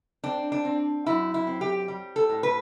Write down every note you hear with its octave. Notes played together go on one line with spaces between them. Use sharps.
C4 D4
D4
C4
F#2 E4
E4
C4
G4
G3
A4
A2
B4